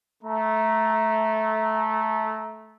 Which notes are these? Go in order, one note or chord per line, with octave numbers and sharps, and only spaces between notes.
A3 A#5